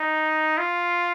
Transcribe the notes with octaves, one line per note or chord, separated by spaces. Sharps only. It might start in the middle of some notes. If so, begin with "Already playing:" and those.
Already playing: D#4
F4